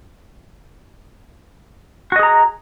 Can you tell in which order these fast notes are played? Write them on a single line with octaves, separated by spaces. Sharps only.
F#4 D#5 G#4 A#5